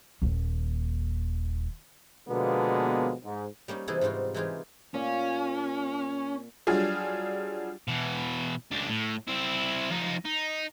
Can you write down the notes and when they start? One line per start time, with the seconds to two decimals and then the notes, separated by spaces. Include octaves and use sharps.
0.22 D#1 D#2
2.29 B2 D3 F3 G#3 A#3 B3
3.24 G#2
3.68 G3 A#3 C#4 D#4
3.88 C3 E3 D#4 E4 G#4 A4
4.01 G#2 G3 D#4 F4 F#4
4.34 E3 G#3 D#4 F4 G4 G#4
4.94 A#2 C#4
6.67 F#3 G3 D4 F4 G#4
7.88 B2 E3
8.71 C#2 D4
8.89 A2
9.27 C4 E4
9.90 F2 D#4
10.25 D#4